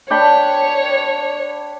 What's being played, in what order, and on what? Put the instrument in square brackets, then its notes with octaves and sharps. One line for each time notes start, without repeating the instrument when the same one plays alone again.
[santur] D4 G5 B5 [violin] C#5